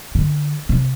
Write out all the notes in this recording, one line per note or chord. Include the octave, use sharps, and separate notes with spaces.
D3
C3